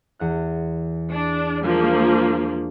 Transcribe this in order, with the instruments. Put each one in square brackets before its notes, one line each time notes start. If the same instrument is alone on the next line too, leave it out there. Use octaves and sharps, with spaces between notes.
[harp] E2 F#5 F#6
[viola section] D4
[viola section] F3 A#3 [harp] G3 G#3 D4